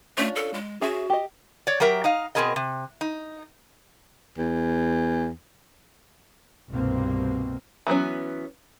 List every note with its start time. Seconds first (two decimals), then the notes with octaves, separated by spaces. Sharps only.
0.18 A3 C#4 D4 F4
0.36 A4
0.54 G#3
0.81 C#4 F#4 G#4 E5
1.10 G4 D#5
1.67 C#5 D5
1.80 F#3 G4 A#4 E5
2.04 D#4 D#5 F5
2.35 B2 F#3 C4 G#4 A#4 D#5
2.56 C3
3.01 D#4
4.38 E2
6.70 C2 G2 B2 A#3 C4
7.87 E3 F#3 B3 C#4